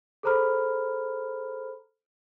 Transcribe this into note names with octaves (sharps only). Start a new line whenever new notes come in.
G#4 A4 C5 A#5 B5 F6